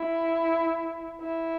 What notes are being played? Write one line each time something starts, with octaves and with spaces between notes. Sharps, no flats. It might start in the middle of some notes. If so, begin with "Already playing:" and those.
Already playing: E4
E4